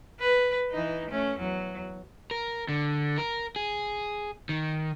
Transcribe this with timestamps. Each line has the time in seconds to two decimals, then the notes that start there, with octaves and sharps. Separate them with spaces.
0.20 B4
0.71 E3 D#4
1.09 A3 C#4
1.39 E2 F#3
2.31 A#4
2.69 D3
3.18 A#4
3.56 G#4
4.49 D#3